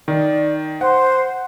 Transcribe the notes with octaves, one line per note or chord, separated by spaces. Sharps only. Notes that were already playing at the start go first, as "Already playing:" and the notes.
D#3 D5
C5 F#5